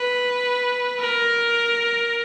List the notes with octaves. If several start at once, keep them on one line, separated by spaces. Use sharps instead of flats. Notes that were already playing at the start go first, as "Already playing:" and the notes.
Already playing: B4
A#4